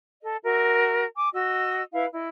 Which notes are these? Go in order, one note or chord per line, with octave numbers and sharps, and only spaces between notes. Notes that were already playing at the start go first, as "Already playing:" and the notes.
A4 D#5
F#4 A#4 E5
G#5 D6
F#4 D#5 E6
E4 B4 E5 F5
E4 D#5